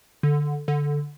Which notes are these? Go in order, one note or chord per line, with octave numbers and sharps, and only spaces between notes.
D3
D3